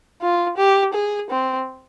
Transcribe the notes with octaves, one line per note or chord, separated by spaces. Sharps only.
F4
G4
G#4
C4